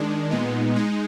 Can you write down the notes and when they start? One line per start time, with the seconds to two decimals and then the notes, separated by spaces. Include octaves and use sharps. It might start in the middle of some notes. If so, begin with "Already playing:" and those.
Already playing: D#3 G#3 D4
0.31 A#2 G#3 B3 D#4
0.76 G#3 D#4